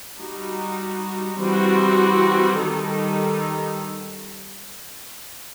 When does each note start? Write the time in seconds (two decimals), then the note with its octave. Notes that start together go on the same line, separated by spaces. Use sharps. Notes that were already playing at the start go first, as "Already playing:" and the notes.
0.19 G3 D#4 F#4
1.39 E3 G3 C4 F#4
2.59 D#3 G3 D#4 A4